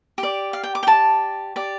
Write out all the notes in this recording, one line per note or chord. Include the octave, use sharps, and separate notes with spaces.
G4
D5
F5
G5
D6
G5
G4 D5 A5
G4 D5